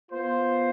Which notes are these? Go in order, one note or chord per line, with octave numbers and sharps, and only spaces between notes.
B3 F4 C5